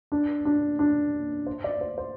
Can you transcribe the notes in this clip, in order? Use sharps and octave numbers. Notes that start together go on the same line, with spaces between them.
D4
D4
D4
C5
D5
C5
C5